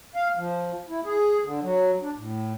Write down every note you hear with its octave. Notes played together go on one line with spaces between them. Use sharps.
F5
F3
E4
G#4
D3
F#3
D4
A2